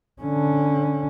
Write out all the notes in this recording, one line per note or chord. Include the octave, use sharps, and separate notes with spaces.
D3 C#4